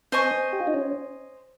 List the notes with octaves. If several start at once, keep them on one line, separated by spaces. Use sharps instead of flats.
C4 C5 D#5 G#5 C#6
G4
F4
D#4
C#4